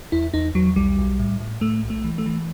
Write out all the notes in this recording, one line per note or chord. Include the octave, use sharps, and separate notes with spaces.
E2 E4
E2 D#4
E2 F#3
B1 G3
B1
A2
A2
A2 A3
B1
A3
E3
A3
E3